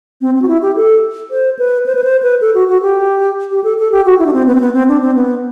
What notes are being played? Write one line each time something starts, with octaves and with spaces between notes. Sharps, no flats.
C4
C4
F#4
E4
G4
A4
C5
B4
C5
B4
C5
B4
A4
F#4
F#4
G4
G4
A4
A4
G4
F#4
E4
D4
C4
B3
C4
B3
C4
D4
C4
B3